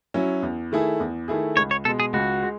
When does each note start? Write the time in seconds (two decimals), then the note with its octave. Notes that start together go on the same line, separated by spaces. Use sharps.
0.14 F#3 C#4 E4
0.43 E2
0.72 D#3 A3 E4 G#4
1.00 E2
1.28 D#3 A3 E4 G#4
1.57 C#2 C#5
1.71 C#5
1.85 B2 A4
1.89 G#3
2.00 G#4
2.13 C#2 F#4
2.43 G#3